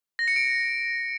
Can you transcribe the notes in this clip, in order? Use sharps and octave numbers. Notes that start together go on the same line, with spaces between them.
A#6
C#7
D7